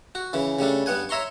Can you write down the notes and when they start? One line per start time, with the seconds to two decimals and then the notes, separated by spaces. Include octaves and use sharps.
0.15 F#4
0.33 C#3 E3
0.59 C#3 G3 A3 D4
0.86 G2 B3 F#5 G#5
1.09 C#5 E5 A#5 C6 C#6